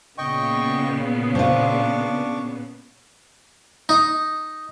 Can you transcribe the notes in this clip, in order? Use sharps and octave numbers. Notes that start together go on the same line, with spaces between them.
A#2 C#3 B3 D#5 G5 C#6
C4 D4 F4 C#6 D6
D#4